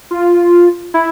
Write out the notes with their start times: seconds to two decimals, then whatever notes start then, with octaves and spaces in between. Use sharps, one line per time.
0.11 F4
0.94 E4